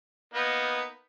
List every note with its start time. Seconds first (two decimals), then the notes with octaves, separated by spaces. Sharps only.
0.34 A#3 B3 D#4